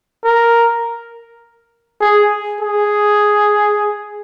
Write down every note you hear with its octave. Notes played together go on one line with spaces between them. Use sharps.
A#4
G#4
G#4